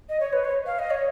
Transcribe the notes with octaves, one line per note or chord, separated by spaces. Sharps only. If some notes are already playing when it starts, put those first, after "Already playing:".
D#5
C#5
B4
C#5
F5
D#5
C#5